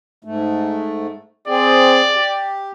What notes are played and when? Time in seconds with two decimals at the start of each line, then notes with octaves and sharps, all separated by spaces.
0.24 G#2 A3
1.47 C4 G#4 D5
2.14 G4